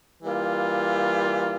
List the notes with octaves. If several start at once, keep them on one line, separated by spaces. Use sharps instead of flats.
E3 G3 A#3 F4